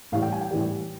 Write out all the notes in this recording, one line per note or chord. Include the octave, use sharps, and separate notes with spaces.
A2 E3 G3 F5
G5
G#5
G5
A2 E3 G3